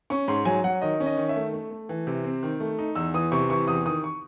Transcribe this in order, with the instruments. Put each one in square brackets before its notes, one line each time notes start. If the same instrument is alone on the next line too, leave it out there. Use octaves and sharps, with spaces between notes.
[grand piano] C#4 C#6
G#2 C6
F#3 G#5
F#3 F#5
D#3 D#5
C#4
D#5
D#3
E5
A3
A3
A3
E3
C3
C4
D#3
A3
D#4
E2 E6
E3 D#6
C3 C#6
E3 C#6
E2 D#6
D#3 D#6
C#6